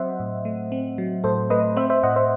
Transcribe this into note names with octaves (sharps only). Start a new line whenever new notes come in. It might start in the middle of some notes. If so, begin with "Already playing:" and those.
Already playing: F#3 C4 C5 D#5 E5 F#5
A2
A3
C4
F#3
A2 A4 C5
A3 B4 D#5
C4 C5 E5
C5 E5
A2 D#5 F#5
C5 E5